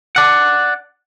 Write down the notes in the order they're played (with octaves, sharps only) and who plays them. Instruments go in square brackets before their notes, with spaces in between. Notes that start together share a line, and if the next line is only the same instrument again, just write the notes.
[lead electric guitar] D5 F#5